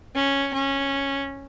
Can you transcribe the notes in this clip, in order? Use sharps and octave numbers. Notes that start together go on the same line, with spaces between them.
C#4
C#4